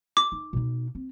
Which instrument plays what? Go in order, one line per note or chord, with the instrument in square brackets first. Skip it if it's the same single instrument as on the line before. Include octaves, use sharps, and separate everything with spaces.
[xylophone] D6
[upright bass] D#4
B2 D#4
C4